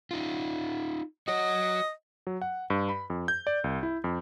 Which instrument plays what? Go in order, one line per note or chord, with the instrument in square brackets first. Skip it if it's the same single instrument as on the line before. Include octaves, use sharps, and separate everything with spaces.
[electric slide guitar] D#4 F4
[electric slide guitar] F#4 C#5 [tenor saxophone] D#5
[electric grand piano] F#3
F#5
G2
B5
F2
G6
D5
C2
E4
F2